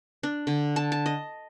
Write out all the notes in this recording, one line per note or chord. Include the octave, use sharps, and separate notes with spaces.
D4
D3
A5
A5
D#5